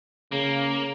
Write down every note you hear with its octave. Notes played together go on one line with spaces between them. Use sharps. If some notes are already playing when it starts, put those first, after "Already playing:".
C#3 A#3